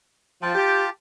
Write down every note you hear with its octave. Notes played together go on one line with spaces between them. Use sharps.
F3 F4 G5 A5
G4